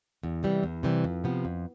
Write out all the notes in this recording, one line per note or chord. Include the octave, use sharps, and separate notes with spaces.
E2
C3 E3 G3
E2
C3 E3 G3
F2
C3 F3 B3
F2